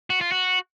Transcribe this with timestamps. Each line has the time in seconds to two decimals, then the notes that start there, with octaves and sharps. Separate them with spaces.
0.10 F#4
0.21 F4
0.32 F#4